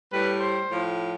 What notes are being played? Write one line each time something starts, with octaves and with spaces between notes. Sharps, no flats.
A2 G3 B4
C5
A2 F3